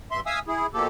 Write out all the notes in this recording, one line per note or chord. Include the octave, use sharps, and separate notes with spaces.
G2 E5 C6
E5 F5 G#5 D#6 E6
E4 G#4
B2 F3 A#3 G4 A4